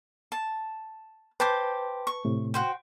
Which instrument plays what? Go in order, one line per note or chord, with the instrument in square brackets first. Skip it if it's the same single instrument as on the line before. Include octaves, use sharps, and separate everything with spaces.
[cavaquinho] A5
[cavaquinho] G4 C5 D6 [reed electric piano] B4 A5
[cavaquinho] C#6
[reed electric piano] A2 C3
[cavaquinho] F#4 C5 G5